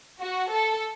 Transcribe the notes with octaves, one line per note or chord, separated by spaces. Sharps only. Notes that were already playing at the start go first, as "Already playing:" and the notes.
F#4
A4